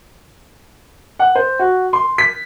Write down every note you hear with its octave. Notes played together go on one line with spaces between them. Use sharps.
F#5
C5
F#4
C6
B6